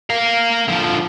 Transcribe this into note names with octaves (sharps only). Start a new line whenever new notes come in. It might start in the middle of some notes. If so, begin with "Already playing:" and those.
A#4 F5
D3 F3